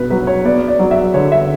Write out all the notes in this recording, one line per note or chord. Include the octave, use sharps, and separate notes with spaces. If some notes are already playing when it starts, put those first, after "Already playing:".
Already playing: B2 B4
F#3 B4
C#5
B3 D5
D5
F#3
E5
D3 C#5
E5